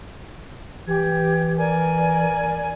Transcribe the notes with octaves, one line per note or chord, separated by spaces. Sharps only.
E3 G4 G#6
A#4 D5 G#5